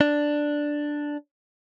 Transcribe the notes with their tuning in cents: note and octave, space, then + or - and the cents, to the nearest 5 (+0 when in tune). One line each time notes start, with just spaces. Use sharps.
D4 +5